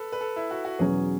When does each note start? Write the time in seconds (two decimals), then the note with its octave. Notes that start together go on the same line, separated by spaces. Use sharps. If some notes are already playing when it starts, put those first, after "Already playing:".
Already playing: A4 B4
0.12 B4
0.21 A4
0.36 E4
0.51 F#4
0.65 F#4
0.79 E2 B2 F#3 C#4 G#4